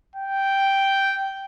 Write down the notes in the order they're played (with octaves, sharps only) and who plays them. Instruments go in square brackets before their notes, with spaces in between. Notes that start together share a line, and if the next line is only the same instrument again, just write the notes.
[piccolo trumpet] G5